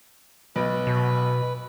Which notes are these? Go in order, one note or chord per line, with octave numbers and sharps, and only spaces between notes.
B1 B4
B2